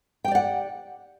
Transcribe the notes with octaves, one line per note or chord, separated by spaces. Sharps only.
G4 D5 F#5 G5